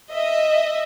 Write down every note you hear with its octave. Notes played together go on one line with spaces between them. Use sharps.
D#5 E5